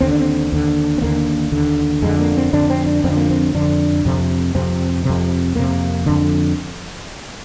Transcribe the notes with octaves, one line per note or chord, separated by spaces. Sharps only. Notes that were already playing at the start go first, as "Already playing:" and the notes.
D#2 D3 C4
D4
C4
D#2 D3
C4
D#2 D3 A#3
D#2 D3
F2 D3 G#3
A#3
C4
F2 D3 D4
C4
D4
F2 D3 C4
A#3
C4
F2 D3 D4
F2 C3
F2 C3 C4
F2 C3
F2 C3 A#3
F2 D3